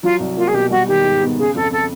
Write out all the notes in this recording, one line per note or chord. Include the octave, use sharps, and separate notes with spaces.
F#3 F4
C2
A#3 F4
G#4
B2 G4
G3 F#4
D#3 G4
G#2
B3
C#3 G#4
F2 A4
A4